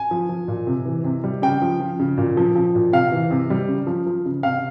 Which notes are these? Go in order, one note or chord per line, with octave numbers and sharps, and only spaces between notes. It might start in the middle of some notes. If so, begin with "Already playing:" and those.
Already playing: G#5
F3
F3
A#2
C3
E3
C3
G3
C#3 G5
F3
F3
C#3
A#2
F3
F3
A#2
C3 F5
E3
C3
G3
C#3
F3
F3
C#3
C3 F5